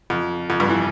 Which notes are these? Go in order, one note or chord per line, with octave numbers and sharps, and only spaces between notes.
F2
F2
G2
E3